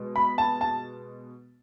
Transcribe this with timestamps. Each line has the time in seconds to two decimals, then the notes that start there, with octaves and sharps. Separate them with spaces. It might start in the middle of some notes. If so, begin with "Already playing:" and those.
Already playing: B2 G#3
0.16 B5
0.38 A5
0.61 A5